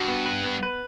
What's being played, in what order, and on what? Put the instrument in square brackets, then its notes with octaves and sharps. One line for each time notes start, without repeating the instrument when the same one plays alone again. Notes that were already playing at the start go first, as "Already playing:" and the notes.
Already playing: [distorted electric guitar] G2 [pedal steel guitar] F#4
[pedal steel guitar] B3
B4
B3
B4